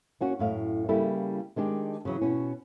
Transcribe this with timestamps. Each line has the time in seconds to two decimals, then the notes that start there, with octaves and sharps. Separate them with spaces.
0.21 A#3 C#4 F#4
0.39 F#2 A2 F5
0.89 C#3 G3 A#3 E4 A4
1.56 D#3 G#3 D4 G4
2.05 C#3 E3 F#3
2.22 B2 C#4